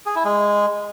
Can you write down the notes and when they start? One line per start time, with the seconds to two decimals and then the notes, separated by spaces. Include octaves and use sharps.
0.06 G#4
0.15 E4
0.25 G#3